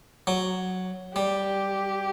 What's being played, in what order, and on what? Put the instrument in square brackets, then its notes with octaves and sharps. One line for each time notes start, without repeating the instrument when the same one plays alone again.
[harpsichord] F#3
[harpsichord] G3 [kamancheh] G4